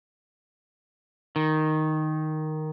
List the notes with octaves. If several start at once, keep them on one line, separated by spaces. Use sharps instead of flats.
D#3